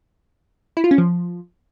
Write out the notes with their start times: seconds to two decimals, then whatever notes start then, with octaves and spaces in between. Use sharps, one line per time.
0.77 E4
0.84 F4
0.91 C#4
0.98 F3